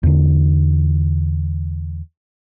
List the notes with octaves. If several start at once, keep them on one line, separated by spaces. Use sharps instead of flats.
E2 D3